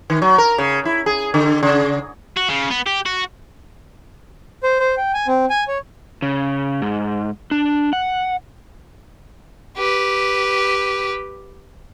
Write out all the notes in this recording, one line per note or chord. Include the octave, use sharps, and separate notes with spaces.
D#3
F#3
A#4
C#3
E4
G#4
D3
C#3
F#4
C#3
B3
G4
F#4
C5
C5
G5
G#5
C4
G#5
C#5
C#3
G#2
D4
F#5
G4 B4